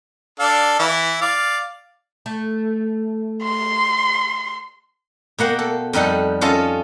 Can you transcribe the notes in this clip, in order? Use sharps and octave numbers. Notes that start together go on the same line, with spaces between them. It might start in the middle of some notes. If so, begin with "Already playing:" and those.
D4 A4 F5
E3 E4
D5 F5
A3
C6
B2 A#3 F#5 G5
A4
F2 G3 D#4 A4 F#5
C#4 F4 A4 D#5 A5